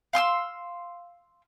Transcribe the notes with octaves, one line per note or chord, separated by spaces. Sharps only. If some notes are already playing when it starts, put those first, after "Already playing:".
F5 C6 D#6 E6